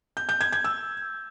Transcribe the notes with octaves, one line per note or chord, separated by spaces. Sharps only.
G6
G6
G#6
G#6
E6